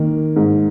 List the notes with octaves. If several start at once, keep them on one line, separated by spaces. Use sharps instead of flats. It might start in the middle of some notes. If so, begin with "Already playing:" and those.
Already playing: D#3 A#3
G#2